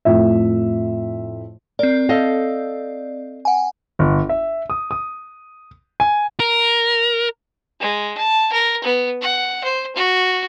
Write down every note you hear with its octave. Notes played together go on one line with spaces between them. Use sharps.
F2 A2 E5
C4 A#4 D5
A4 D#5 F5
F#5 G#5
G1
E5
D#6
D#6
G#5
A#4
G#3
A5
A#4
B3
F#5
C5
F#4